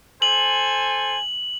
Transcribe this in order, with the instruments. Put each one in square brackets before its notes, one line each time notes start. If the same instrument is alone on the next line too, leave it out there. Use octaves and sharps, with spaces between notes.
[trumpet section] A4 C5 G#5 [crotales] F#7